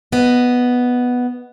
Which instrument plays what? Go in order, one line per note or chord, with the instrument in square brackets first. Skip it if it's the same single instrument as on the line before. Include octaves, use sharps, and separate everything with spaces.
[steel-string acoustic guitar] B3 D#5